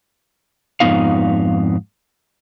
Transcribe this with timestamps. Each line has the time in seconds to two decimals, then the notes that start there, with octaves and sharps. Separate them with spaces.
0.80 F2 G#2 E3 B3 D#4 F5